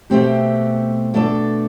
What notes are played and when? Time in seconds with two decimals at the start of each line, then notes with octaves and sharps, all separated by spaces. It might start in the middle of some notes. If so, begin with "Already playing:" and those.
0.10 B2 A3 C4 G4
1.14 B2 A3 D4 A4 D5